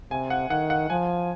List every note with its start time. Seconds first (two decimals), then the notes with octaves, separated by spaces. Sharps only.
0.11 C3 G#5
0.30 F#5
0.50 D#3 F#5
0.70 F#5
0.90 F3 G#5